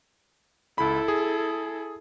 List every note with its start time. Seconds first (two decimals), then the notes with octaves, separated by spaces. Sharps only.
0.78 C#2 E4 A4 B5
1.08 G#4